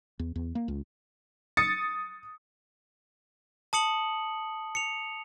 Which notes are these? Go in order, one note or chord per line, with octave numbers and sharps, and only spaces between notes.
E2
E2
A#3
C#2
D#6 A6 C#7
A5 D#6 C#7 F#7
C#7 F7